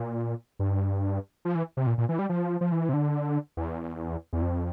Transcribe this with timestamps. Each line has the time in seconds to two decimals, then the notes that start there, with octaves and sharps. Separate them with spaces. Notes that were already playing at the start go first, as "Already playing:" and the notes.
Already playing: A#2
0.59 G2
1.45 F3
1.55 E3
1.77 C3
1.87 A#2
1.98 A#2
2.09 E3
2.19 G3
2.29 F3
2.61 F3
2.72 E3
2.89 C3
2.93 D3
3.57 E2
4.33 E2
4.42 F2